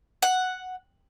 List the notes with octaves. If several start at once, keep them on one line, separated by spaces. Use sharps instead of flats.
F#5